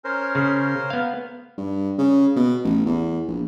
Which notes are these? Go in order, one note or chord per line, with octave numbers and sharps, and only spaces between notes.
C#4 A#4 C5
C#3
B3 F5
G2
C#3
B2
A1
E2
A#1